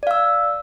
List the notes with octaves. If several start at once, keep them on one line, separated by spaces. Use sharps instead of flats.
D5 F5 E6